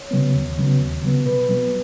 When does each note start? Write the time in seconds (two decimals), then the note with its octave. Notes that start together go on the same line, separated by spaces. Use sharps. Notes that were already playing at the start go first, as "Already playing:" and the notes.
Already playing: C#5
0.11 C#3 F#3 B3
0.35 D#2
0.58 C#3 F#3 B3
0.80 D#2
1.02 C#3 F#3 B3
1.26 B2 B4
1.49 F#3 B3